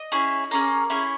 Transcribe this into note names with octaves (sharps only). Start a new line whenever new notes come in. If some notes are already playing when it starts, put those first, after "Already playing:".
Already playing: D#5
C#4 E4 G#4
A#3 C#4 G#4
C#4 E4 G#4